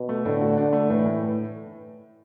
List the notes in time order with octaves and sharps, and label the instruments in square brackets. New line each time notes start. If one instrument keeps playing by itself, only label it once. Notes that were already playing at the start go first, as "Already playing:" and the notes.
Already playing: [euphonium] B2
[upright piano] A3
[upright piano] A2 [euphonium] D3
[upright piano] F#4
D4
A3
[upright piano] A2 [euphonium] E3
[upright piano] A2